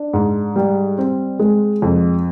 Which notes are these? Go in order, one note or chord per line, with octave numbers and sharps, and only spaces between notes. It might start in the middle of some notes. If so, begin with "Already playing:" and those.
Already playing: D4
G#2
G3
C4
G#3
F2